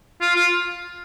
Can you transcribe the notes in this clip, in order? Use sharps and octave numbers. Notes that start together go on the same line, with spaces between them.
F4
F4